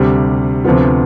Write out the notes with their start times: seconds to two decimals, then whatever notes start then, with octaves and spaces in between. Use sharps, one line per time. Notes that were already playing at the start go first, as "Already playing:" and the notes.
Already playing: D2 C3 G3
0.64 D2 C3 F3 B3 F4